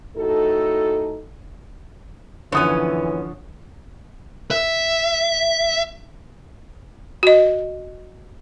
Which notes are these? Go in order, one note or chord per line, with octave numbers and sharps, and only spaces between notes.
A2 D#4 F#4 A4
F#2 D3 E3 F3 B3 C#4 C#5 D#6
E5
F#4 D#5